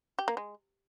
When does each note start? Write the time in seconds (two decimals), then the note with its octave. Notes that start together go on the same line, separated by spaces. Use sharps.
0.19 G4
0.28 A#3
0.37 G#3